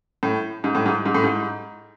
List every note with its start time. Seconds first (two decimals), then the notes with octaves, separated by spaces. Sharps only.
0.23 A2
0.64 G#2
0.75 A2
0.86 G#2
1.06 G#2
1.15 A2
1.24 G#2